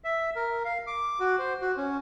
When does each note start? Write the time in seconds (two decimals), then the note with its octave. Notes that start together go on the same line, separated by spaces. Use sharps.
0.04 E5
0.36 A#4
0.65 F5
0.87 D6
1.20 F#4
1.38 C5
1.61 F#4
1.77 C#4